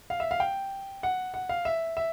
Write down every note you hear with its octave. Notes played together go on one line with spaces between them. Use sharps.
F5
E5
F5
G5
F#5
F#5
F5
E5
E5